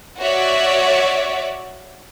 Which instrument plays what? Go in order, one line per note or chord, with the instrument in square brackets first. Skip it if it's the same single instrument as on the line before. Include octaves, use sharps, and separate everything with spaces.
[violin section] F#4 C#5 D5 E5